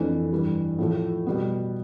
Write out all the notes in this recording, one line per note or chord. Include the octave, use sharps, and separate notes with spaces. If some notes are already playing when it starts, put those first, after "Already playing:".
Already playing: F2 E3 A3 D4
G2 E3 G3
A2 F3 A3
B2 G3 B3